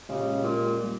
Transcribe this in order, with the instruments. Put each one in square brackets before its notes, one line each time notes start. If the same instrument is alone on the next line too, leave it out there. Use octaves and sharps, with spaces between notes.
[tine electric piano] A#2 G#3 C#4 G4 [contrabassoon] C#3
[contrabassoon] A#2
[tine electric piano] G3 A#3